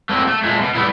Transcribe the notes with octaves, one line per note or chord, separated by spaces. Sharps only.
A3 A#3 C4 F#4 A#4
A3
A#2 G#3 A3
B2
G3 A3 B3 E4